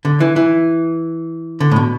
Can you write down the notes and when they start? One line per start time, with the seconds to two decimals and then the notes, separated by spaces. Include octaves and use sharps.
0.05 D3
0.20 E3
0.36 E3
1.60 D3
1.71 A2
1.76 B2